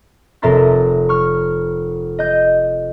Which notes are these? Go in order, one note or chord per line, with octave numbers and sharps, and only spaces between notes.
F1 A#4 E5 C6 A6
C#6 F6
D#5 G6